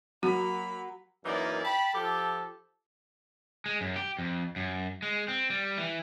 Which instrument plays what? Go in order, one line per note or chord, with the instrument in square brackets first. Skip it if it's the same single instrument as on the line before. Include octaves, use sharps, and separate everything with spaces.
[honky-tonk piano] F#3 [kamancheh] A#3 B5 [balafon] F#4
[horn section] F#2 E3 A#3 D#4 D5
G5 A5 B5
F3 G4 A4
[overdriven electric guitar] G#3
F#2
G4
F2
F#2
G#3
C4
G3
E3